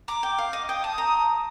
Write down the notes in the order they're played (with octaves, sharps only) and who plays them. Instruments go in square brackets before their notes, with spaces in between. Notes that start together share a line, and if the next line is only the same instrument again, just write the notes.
[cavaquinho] A#5 [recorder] D6
[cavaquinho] G5
F5
D#5
[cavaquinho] G5 [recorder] D#6
[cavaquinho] A5
A#5